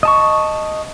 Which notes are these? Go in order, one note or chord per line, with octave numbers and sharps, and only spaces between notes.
D#5 A5 C#6